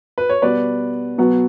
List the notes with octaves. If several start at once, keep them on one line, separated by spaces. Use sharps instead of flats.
B4
C#5
B2 G3 B3 B4 D5
B2 F#3 B3